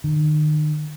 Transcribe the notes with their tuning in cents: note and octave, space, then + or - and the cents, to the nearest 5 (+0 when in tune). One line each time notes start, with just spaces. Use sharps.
D#3 -35